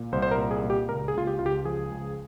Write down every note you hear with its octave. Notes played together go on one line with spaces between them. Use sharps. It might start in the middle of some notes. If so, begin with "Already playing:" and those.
Already playing: A#2
C2 C5
C5
A#4
A#2
G#4
A#2
G4
C#2 A#4
G#4
C#2 F4
G4
C#2 F4
G4
F3 G#4
C#2